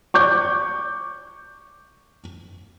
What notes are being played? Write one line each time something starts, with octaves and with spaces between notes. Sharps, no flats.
C#6 D6 G6